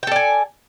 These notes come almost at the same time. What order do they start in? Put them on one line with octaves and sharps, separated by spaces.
G5 A4 D5 G#5